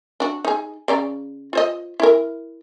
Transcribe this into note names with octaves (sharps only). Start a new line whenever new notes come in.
D4 F#4
D#4 G#4
C#3 D5 A#5
F4 C5 D#5
E4 A#4